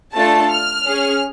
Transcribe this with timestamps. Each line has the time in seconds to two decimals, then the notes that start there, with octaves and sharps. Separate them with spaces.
0.14 A3 D4 F4 A4 A5
0.50 F6
0.86 C#4 G#4